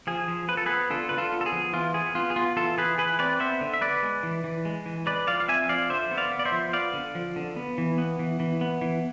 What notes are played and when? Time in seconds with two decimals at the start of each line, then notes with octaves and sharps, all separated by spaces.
0.07 F3 G#4
0.28 F3
0.48 F3 B4
0.57 A4
0.66 B3 G#4 B4
0.90 D3 F4 A4
1.09 D3 B4
1.18 F4 A4
1.32 B3
1.41 A4
1.46 G#4
1.52 F3
1.73 E3 F4
1.94 B3 G#4
2.15 B3 F4
2.30 G#4
2.36 B3 F4
2.57 E3 F4 A4
2.78 E3 G#4 B4
2.98 E3 G#4 B4
3.19 C4 B4 D5
3.40 B3 C5 E5
3.61 D3
3.74 E5
3.81 B3 B4 D5
4.03 G#3
4.23 E3
4.44 E3
4.65 G#3
4.86 E3
5.06 G#3 B4 D5
5.27 F3 D5 F5
5.40 F5
5.48 C4 E5 G#5
5.69 F3 D5 F5
5.90 D3 C5 E5
6.11 B3
6.18 D5 F5
6.31 B3
6.39 D5
6.45 C5 E5
6.52 F3
6.73 B3 D5 F5
6.94 D3
7.15 F3
7.36 D3
7.56 B3
7.78 E3
7.98 B3
8.19 E3
8.40 E3
8.61 B3
8.81 E3